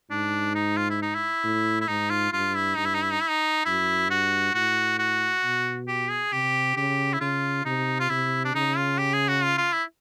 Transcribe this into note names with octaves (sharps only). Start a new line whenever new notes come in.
G#2 D4
D#4
F4
E4
D#4
E4
A2
E4
G#2 D#4
F4
G2 F4
E4
G2 D#4
E4
D#4
E4
D#4
E4
D#4
F#2 E4
G2 F#4
A2 F#4
F#4
B2
G4
G#4
C3 G4
C#3 G4
E4
C#3 F4
C3 D#4
F4
C3 E4
D4
C#3 D#4
F4
G4
G#4
F#4
F4
F4
E4